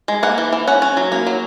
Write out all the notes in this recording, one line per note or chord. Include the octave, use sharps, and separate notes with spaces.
G#3
A#3 F#5
E3
E3
C#4 F#5
C#4
F#3
A#3
F#3